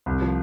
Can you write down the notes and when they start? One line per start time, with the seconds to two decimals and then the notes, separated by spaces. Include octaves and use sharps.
0.06 C2
0.21 F3